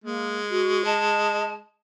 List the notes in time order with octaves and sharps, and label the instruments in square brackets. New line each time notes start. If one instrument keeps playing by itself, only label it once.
[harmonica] G#3 [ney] A#3
[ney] F#4
[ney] D#5 [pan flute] A5